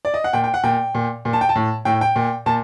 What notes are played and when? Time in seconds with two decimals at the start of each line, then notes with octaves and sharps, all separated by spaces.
0.05 D5
0.14 D#5
0.24 F#5
0.33 A#2 G5
0.44 G5
0.54 F#5
0.64 A#2 G5
0.95 A#2
1.25 A#2
1.33 A5
1.41 G5
1.49 A5
1.55 A2
1.85 A2 G5
2.01 G5
2.16 A#2
2.46 A#2 A5